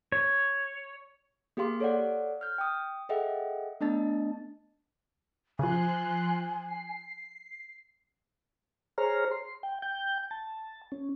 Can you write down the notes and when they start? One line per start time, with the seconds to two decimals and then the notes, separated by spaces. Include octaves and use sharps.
0.12 C#5
1.57 A#3 G4 G#4 F5 C6 D6
1.80 A4 C#5 D5 F5 F#5
2.41 F6 G6
2.58 G5 D#6
3.09 G#4 A4 D#5 E5 F#5 G5
3.81 A3 B3 D4 D#5 A5 A6
5.59 C#3 F3 F4 G#5 C6 F#6
6.65 C7
8.98 G#4 C5 C#5 A#5 F6
9.31 C6
9.63 G5
9.82 G5 G6
10.31 A5
10.92 C#4